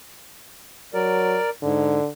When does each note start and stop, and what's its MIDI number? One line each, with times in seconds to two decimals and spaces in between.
0.94 1.38 54
0.94 1.49 70
0.94 1.49 74
1.62 2.00 44
1.62 2.08 50